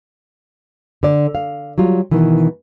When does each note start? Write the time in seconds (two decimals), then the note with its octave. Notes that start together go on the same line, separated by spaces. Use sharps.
1.03 D3 D5
1.35 F5
1.78 F#3 G3 F4
2.11 B2 D#3 E3